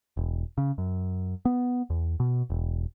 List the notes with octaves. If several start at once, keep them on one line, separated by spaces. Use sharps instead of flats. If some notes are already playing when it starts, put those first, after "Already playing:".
E1
C#3
F#2
B3
E2
B2
E1